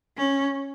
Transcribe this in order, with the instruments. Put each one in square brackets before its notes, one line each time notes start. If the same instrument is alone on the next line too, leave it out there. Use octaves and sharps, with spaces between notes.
[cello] C#4